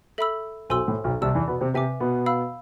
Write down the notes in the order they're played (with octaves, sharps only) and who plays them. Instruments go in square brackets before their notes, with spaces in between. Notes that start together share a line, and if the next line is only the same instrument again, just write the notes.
[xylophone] A4 E5 B5 E6
[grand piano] B1 B2 [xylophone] A4 C5 G#5 C6 E6
[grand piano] A2
B1 B2
[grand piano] C2 C3 [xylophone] D5 A5 E6
[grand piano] E2 E3
B2 B3
C3 C4
[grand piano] C3 C4 [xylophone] B4 E5 G#5 D6
[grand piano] B2 B3
[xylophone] F5 B5 E6